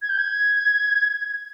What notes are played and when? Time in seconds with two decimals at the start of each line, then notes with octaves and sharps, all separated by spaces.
0.02 G#6
0.09 G6
0.18 G#6